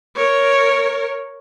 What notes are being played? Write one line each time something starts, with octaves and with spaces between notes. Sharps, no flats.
A#4 C#5